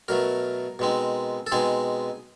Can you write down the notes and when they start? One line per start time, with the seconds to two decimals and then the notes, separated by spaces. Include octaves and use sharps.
0.08 B2 F#3 A3 A#4
0.79 B2 G#3 C4 D#4
1.47 A4
1.52 B2 G#3 C4 D#4 G#4